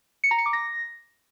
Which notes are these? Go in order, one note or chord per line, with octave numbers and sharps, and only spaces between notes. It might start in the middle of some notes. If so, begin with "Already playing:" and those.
C#7
A#5
C#7
D6
A#6